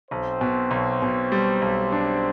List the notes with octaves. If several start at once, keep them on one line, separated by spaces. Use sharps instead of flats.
B1 C4 C5
B2
B1
B2
G3
B1
D4